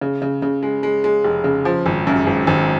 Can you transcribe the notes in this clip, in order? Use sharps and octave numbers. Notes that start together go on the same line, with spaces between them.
C#3
C#3
C#3
G#3
G#3
G#3
F1
C#3
F3
G#1
F#2
G#1
G#1